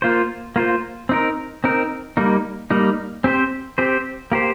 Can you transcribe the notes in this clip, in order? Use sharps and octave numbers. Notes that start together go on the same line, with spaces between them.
A#3 F4 C5
A#3 F4 C5
C4 D#4 A#4
C4 D#4 A#4
G3 A#3 D#4
G3 A#3 D#4
C4 G4 C5
C4 G4 C5
A#3 G4 C5